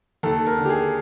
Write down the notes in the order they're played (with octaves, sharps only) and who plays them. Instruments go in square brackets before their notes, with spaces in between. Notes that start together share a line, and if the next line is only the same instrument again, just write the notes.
[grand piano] D#2 A4
A#4
D3
G4
G#4